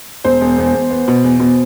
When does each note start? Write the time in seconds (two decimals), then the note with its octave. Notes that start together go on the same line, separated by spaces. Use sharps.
0.24 E1 C5
0.41 E1
0.58 E2
0.74 E2
0.91 B3
1.08 B2
1.24 E2
1.40 B2